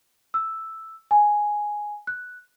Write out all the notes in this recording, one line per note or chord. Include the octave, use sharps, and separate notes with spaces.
E6
G#5
F#6